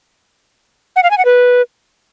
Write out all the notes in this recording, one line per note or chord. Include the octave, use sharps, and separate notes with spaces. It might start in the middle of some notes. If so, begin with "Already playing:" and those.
F#5
F5
G#5
F#5
B4